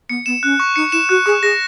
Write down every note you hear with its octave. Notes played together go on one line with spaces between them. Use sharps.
B3 C#7
B3 E7
C#4 F#6
C#6
D#4 C#7
E4 E7
F#4 F#6
G#4 C#6
G#4 A#6